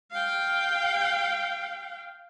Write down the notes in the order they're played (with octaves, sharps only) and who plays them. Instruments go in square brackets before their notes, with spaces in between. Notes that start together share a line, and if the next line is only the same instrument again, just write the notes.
[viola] F5 G5